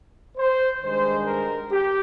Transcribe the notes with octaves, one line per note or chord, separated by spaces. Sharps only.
C5
G2 D#3 G#3 C5
A#4
G4